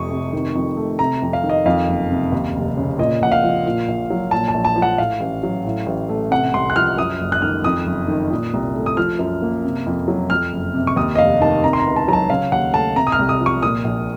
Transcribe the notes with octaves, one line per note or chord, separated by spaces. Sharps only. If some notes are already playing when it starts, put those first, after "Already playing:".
Already playing: F1 F2 C#6 D#6
C3
D#3
F2
A3
C3 A#5
F2
F5
D#3
D#5
F2 F5
F#1
C3
D#2
F1
C#3
A#2 D#5
A#1 F#5
F5
F3
A#2
A#1
F#3
A#2 A5
A5
A#1
A5
F3
F#5
A2 F5
A1
F#3
A2
A1
A3
C3 F#5
C2 C6
F#6
F3 F6
F#2 D#6
F#1
F#6
D#3 F6
F2 D#6
F#1
D#3
A#2
C2
A3
D#6
F3 F6
F#2
A#3
C3
F2
F#3
F2 F6
F#1
C3
C#6
D#2 D#6
D#5
F1 F5
D#3 A5
C3 A#5
C6
A#5
C#2
A5
F#3 A#5
A5
C#3 F5
D#2 F#5
A3 A5
C3 A#5
D#6
F6
C2
D#6
F3
C#6
A#2 D#6
A#1